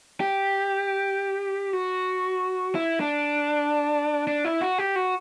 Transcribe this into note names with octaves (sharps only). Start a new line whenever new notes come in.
G4
F#4
E4
D4
D4
E4
F#4
G4
F#4